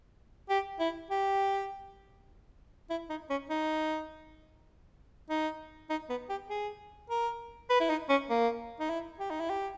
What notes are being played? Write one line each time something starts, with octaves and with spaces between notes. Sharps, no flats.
G4
E4
G4
E4
D#4
C#4
D#4
D#4
D#4
B3
G4
G#4
A#4
B4
E4
D#4
C#4
A#3
D#4
E4
G4
D#4
E4
G4